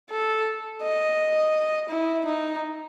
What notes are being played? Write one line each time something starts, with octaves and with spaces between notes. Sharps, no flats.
A4
D#5
E4
D#4